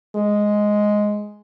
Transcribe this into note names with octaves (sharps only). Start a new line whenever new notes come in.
G#3